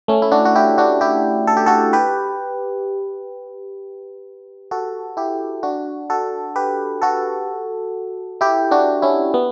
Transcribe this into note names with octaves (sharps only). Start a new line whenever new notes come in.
A3 C#4
E4
D4 F#4
F#4
E4 G4
D4 F#4
E4 G4
A4
G4
F#4 A4
G4 B4
F#4 A4
E4 G4
D4 F#4
F#4 A4
G4 B4
F#4 A4
E4 G4
D4 F#4
C#4 E4
B3